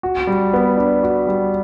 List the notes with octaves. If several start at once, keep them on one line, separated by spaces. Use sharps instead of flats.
F#4
G3
B3
D4
F#4
G3